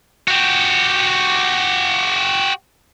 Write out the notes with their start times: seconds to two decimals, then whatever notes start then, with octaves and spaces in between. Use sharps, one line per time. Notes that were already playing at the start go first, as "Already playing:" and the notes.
0.28 F#4 G4